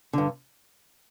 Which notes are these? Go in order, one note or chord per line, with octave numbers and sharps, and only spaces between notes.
G2 D3